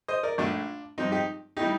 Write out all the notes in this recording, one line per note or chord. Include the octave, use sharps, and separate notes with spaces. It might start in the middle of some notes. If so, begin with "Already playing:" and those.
C5 D#5
A#4 D5
A#1 A#2 A3 D4 F4
G2 F3 C4 D#4
D#4 G4
A2 G3 D#4 G4